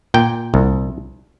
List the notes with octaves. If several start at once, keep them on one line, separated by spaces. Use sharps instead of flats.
A#2 G5
C2